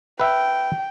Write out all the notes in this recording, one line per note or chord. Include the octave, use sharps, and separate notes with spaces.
B4 E5 G5